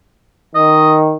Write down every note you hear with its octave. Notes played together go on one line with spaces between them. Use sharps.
D#3 D#5